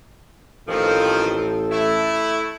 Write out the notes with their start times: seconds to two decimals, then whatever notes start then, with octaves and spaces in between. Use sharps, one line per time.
0.68 A1 D#3 F3 C4 A4
1.70 A3 E4